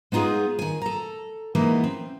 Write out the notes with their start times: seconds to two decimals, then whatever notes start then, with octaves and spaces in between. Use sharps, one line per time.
0.12 G#3 B3 D#4 F4 G#4
0.59 D#3 G#5
0.82 A4 A#5
1.55 E3 G3 G#3 A#3 B3 D#4
1.84 C4